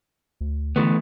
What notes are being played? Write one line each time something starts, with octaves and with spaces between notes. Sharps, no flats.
D2
D3 E3 A3 B3